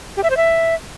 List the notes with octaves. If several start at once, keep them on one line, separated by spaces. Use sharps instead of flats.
G4
E5
C5
E5